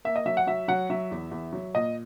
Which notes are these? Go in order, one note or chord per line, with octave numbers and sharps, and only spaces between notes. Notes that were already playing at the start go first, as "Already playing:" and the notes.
A#3 E5
D#5
F#3 E5
F#5
F#3 E5
F#3 F#5
F#3 E5
E2
E2
F#3
A#2 D#5